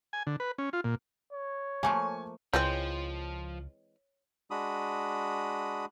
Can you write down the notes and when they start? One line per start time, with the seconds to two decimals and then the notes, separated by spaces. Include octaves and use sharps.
0.13 G#5
0.27 D3
0.40 B4
0.58 C#4
0.73 F4
0.84 A#2
1.33 C#5
1.83 F3 A3 A#3 G#5 C#6
2.53 C#2 E3 F3 G#3 C4 C#5
4.51 G#3 D4 F#4 B5 D#6